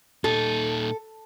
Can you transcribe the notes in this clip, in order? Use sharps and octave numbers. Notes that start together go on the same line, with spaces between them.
A#2 D#4 A4